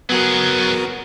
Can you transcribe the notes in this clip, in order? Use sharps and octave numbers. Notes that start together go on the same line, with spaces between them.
F#3 B3 F#4 G#4 A#4